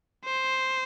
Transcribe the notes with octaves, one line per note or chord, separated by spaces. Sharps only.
C5